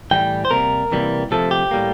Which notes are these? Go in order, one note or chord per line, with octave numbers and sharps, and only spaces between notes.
A2 E3 G3 G5
C5
C3 G3 A#3 A#4
C3 E3 G3 A#3
C3 F3 A3 A4
G4
A2 G3 A#3